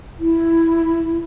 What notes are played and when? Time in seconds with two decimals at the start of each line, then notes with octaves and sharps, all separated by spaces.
0.20 E4